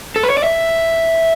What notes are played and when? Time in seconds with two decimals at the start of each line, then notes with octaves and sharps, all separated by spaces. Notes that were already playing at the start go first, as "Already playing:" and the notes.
0.16 A4
0.23 B4
0.30 C#5
0.37 D5
0.44 E5